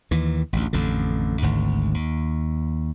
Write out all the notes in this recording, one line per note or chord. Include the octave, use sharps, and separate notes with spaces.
D#2 E3
A1 D2
A1 F2 D3
G#1 D2 G#2
D#2